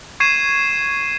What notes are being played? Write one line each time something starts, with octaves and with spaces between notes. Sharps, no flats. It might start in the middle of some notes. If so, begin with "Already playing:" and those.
C#6 G#6 C7 D#7 E7